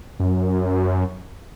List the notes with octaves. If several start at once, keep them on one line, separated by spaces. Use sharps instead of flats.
F#2